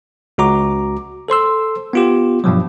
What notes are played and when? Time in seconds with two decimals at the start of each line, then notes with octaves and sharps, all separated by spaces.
0.38 C#2 F#4 A#5 D6
1.28 A4 C5 C6 E6
1.93 B3 F4 G4
2.44 G2 B2 F3 F#3